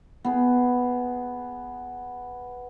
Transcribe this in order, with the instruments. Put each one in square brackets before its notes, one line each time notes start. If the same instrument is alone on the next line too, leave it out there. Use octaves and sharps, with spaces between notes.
[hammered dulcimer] B3 G#4